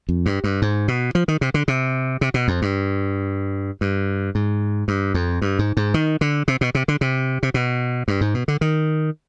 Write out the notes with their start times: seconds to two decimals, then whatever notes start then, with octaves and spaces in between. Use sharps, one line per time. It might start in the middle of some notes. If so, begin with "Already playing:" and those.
0.09 F2
0.26 G2
0.44 G2
0.62 G#2
0.88 B2
1.15 F3
1.28 D#3
1.41 C3
1.54 D3
1.68 C3
2.21 C3
2.34 B2
2.48 F2
2.62 G2
3.81 G2
4.35 G#2
4.88 G2
5.14 F2
5.42 G2
5.59 G#2
5.77 G#2
5.94 D#3
6.21 D3
6.48 C3
6.61 B2
6.75 C3
6.88 D3
7.01 C3
7.43 C3
7.54 B2
8.08 G2
8.21 G#2
8.34 B2
8.48 D3
8.61 D#3